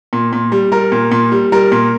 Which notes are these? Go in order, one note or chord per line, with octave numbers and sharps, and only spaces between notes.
A#2
A#2
G3
G3 A#4
A#2
A#2
G3
G3 A#4
A#2